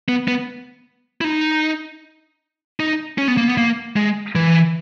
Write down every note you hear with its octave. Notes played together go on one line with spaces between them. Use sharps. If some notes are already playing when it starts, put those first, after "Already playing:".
B3
B3
E4
D#4
D#4
C#4
B3
A#3
B3
A#3
G#3
E3